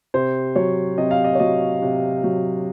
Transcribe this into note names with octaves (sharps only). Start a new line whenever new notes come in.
C3 C5
F#3 C#5
C3 D#5
F5
D#5
C#5
F#3 D#5
C3
F#3